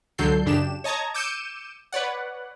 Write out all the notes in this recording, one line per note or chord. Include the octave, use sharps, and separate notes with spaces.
C#2 D3 F#3 A4 G6 C7
F#2 C#3 D4 G4 E7
C#5 D#5 A5 A#5 G#6
D6 E6 G6 C#7 D#7 E7
B4 C#5 D5 F#5